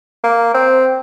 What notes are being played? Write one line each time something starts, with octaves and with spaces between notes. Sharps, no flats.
A#3
C4